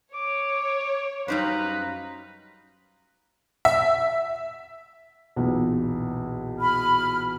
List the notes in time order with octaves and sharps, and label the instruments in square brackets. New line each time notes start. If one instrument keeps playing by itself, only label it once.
[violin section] C#5 [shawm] D6
[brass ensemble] F#2 F5 A#5 [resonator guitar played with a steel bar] G3 D#4 C5 [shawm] B4
[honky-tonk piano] E5
[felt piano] B1 E2 A#2
[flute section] B5 F6